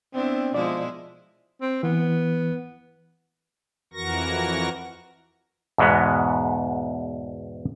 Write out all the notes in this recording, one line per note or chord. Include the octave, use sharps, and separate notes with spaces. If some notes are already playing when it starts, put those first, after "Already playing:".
B3 C4 D4 E4
B2 F3 G#3 E4 D5
C4
E3 B3
F2 E3 F#4 A#4 C#6 A#6
E2 G#2 B2 G#3 B3